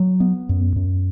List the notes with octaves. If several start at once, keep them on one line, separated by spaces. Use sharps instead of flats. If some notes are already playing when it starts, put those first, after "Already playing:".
Already playing: F#3
B3
F#2
F#2